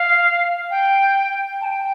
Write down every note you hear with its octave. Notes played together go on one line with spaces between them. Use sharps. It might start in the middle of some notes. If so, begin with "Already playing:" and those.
Already playing: F5
G5
A5
G5